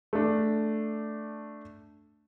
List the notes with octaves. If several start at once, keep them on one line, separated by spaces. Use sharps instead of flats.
A3 D4